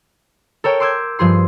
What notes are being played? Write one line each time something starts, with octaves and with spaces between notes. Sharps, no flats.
A4 A#4 C#5 G5
C6 D6 E6 G6 G#6
G2 F3 G#4 C6